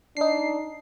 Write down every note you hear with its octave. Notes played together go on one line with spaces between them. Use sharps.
D4 D#4 C7